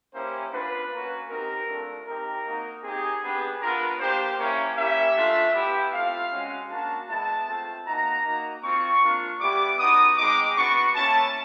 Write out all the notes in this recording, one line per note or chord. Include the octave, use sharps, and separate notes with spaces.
A#3 C#4 E4 G4 C5
B3 D4 F4 B4
A#3 C#4 F#4
C4 D#4 G4 A#4
A3 D4 F4
C4 D#4 G4 A#4
A#3 D#4 F#4
C4 D#4 G4 G#4
B3 D4 G4
B3 D4 F4 A#4
A#3 D4 G4 C5
A#3 C#4 E4 G4 C#5
A#3 C#4 E4 G4 E5
A3 D4 F4
B3 E4 G4
A3 C4 F4 F5
G#3 C#4 F#4
A#3 D4 F#4 A5
G#3 B3 E4 A5
A3 C4 F4
A#3 D#4 F#4 A#5
A#3 D#4 F#4
C4 F4 C#6
A#3 D4 F4
G3 B3 E4 G4 D6
B3 D#4 F#4 D#6
G#3 C4 D#4 D6
B3 D4 F#4 C#6
A#3 C#4 E4 A5